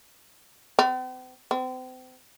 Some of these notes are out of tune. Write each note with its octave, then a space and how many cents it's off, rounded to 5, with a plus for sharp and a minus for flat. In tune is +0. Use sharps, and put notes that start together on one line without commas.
C4 -45
C4 -35